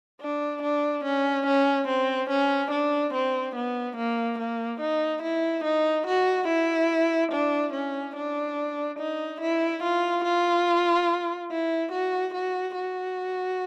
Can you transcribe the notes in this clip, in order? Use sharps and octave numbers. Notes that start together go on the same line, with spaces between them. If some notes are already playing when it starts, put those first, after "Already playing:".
D4
D4
C#4
C#4
C4
C#4
D4
C4
B3
A#3
A#3
D#4
E4
D#4
F#4
E4
D4
C#4
D4
D#4
E4
F4
F4
E4
F#4
F#4
F#4